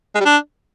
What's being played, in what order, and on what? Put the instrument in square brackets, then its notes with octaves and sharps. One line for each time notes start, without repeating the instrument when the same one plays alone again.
[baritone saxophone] G#3
G3
D4